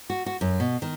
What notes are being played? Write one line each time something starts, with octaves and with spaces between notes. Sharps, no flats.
F#4
F#4
F#2
B2
D#3